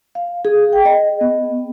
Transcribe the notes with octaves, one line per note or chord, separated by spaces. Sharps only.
F5
G#4
G5
D#5
B3